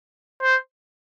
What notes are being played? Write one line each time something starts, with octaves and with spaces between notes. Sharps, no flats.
C5